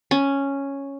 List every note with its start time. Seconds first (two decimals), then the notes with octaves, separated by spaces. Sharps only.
0.11 C#4